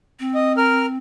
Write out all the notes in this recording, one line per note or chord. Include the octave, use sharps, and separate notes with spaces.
C4
D#5
A#4 F6